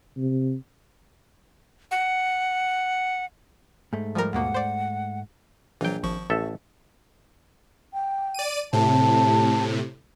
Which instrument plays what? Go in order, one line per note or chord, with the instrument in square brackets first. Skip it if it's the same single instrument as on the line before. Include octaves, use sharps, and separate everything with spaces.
[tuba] C3
[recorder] F#5
[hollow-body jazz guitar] G#2 A3
[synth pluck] F3 G3 A#4
[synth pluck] D#2 B2 A#3 [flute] F#5
[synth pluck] C5 D5
[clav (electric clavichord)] A#1 G5 [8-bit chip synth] E3 F#3
[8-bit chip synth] G#1 F3 C#6
[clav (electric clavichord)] A1 A4 E5
[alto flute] G5
[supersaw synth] D5 D#7
[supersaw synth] A2 C3 [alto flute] A5